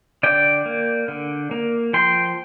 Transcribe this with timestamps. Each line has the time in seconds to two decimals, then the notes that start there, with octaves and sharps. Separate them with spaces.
0.23 D3 D5 G5
0.66 A#3
1.08 D3
1.51 A#3
1.93 F3 G5 C6